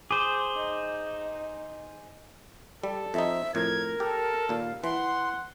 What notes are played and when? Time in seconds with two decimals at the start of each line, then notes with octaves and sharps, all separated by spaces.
0.11 G#4 C5 D6
0.56 D#4
2.84 G3 A4
3.14 F2 C4 D#4 E5
3.55 F2 A2 A#4 G#6
4.00 G4 A4
4.49 D#2 A#2 F5
4.84 E3 F#5 C6